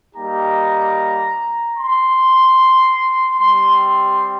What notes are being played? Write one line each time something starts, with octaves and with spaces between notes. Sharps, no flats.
G3 A#3 D#4 G4 A#5
C6
G3 C4 G4 C6
C6